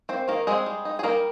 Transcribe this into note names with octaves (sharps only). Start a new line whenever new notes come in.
A#3 C4 C5
D#3 A#3 A#4
G#3 C4 G#4
G3
D#4
G#4
G3 A#3 A#4